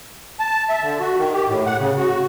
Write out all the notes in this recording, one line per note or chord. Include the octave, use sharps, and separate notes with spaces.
A5
E5
D3
F#4
D#3
G4
A2
F#5
C#3
F#4